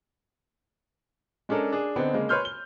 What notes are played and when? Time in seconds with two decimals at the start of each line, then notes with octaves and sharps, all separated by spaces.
1.49 G#3 C#4 D4 A4 A#4
1.72 D4 G#4
1.96 D3 B3 C4 D#4
2.14 C#3 G#3 A#3
2.29 B4 C#5 C6 F6 G6
2.45 G7